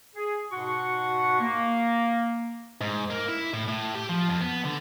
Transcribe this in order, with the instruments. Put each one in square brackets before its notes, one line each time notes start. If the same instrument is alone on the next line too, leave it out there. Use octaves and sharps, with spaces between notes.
[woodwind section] G#4
G#2 B2 F#4 F#5 C6 C#6
A#3
[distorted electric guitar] G#2
A#3
E4
A2
A2
G4
F3
F2
B3
D3